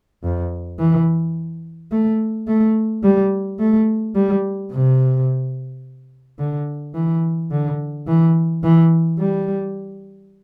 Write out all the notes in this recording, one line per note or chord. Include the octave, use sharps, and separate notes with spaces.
F2
E3
A3
A3
G3
A3
G3
C3
D3
E3
D3
E3
E3
G3